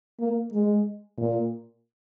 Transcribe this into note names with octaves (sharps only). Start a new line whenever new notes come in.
A#3
G#3
A#2